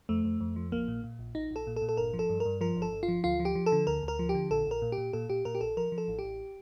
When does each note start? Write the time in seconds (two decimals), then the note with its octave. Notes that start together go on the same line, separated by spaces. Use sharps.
0.09 F2 A3
0.25 F2
0.40 F2
0.56 F3
0.72 A#1 A#3
0.88 A#2
1.04 A#2
1.19 A#1
1.35 A#1 D#4
1.51 A#1 A4
1.67 A#2
1.76 A4
1.82 A#2
1.89 A4
1.97 G1 A#4
2.14 F3
2.19 A4
2.29 G2
2.40 A#4
2.45 G2
2.61 F3 A#4
2.77 G1
2.82 A4
2.93 G1
3.03 F4
3.08 F3
3.24 D2 F4
3.40 F3
3.45 G4
3.55 F3
3.66 A4
3.72 D3
3.87 D2 A#4
4.03 D2
4.08 A#4
4.19 F3
4.29 G4
4.34 D3
4.50 A#1 A4
4.66 A#1 A#4
4.82 A#2
4.92 G4
4.98 A#2
5.13 A#2 A4
5.30 A#2 G4
5.45 A#2 A#4
5.55 G4
5.61 A#1 A4
5.77 F3 A#4
5.92 F3
5.98 A4
6.08 A1
6.19 A1 G4